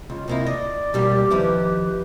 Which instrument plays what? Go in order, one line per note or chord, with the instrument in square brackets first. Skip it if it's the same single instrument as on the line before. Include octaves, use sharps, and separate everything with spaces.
[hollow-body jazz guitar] C#2 [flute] F4
[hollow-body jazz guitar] C3 A#3 E4 [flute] D#5
[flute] D5 [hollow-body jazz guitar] D#5
[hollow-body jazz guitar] B2 G3 A#3 [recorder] G4
[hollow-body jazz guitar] D#2 F3 E4 [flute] B4